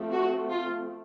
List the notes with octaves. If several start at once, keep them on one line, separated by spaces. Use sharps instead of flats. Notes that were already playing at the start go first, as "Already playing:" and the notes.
Already playing: F3 A3 C4
F#4
F4